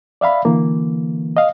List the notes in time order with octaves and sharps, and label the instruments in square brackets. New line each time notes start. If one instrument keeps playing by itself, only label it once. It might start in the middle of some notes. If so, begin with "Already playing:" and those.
[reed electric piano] D5 E5 F5 B5
D3 E3 A#3
D#5 F5